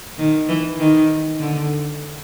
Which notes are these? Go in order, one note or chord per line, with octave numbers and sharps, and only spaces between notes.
D#3
E3
D#3
D3